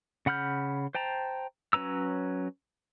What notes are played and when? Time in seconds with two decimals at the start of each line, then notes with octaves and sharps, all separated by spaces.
0.26 C#3 F#5 B5 F6 G6
0.95 C5 G5 A5 A#5
1.73 F#3 C#4 B4 A#5 E6